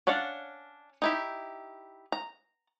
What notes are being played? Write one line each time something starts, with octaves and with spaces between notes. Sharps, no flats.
C#4 D4 D5 F5 F#5
D#4 E4 G4
A#5